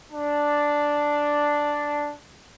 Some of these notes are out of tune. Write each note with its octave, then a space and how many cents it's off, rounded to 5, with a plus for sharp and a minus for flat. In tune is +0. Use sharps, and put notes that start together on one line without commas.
D4 +0